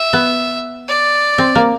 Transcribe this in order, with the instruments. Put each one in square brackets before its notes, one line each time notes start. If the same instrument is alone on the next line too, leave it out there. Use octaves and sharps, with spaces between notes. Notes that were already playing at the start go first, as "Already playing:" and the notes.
Already playing: [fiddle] E5
[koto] B3
[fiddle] D5
[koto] C4
A#3